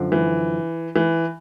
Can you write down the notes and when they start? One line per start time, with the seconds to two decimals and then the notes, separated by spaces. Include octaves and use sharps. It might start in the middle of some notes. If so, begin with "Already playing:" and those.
Already playing: F#2 D3 F3
0.12 E3
0.96 E3